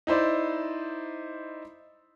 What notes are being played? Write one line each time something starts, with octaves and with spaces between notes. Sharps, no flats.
D#4 E4 C5 D5